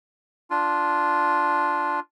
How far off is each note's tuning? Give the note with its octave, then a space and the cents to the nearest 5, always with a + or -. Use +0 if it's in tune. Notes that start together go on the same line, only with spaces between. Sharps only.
D4 +0 F4 +0